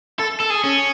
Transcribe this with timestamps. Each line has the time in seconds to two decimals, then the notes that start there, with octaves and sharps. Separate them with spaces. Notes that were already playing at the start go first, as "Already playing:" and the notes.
0.19 A4
0.40 A4
0.50 G#4
0.64 C#4